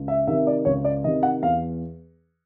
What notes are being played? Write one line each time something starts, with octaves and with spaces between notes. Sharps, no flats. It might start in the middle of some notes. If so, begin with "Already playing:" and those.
Already playing: C#2
E5
C3 D#3 E5
D5
C#2 C#5
D5
C3 D#3 D#5
F#5
E2 F5